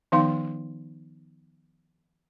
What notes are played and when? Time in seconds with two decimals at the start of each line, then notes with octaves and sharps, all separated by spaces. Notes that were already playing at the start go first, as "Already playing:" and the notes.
0.12 D#3 F3 B3 D#4 F5 C6